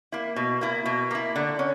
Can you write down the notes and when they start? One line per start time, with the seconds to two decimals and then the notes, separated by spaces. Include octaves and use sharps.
0.12 A#3 E4
0.36 B2
0.61 A#3 E4
0.86 B2
1.11 A#3 E4
1.36 D3
1.59 C#4